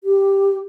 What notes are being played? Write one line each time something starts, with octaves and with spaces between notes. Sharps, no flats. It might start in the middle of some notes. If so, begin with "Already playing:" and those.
G4